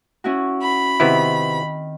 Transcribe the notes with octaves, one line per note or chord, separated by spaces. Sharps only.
C#4 E4 F#4
B5
C3 D#3 B3 C4 E4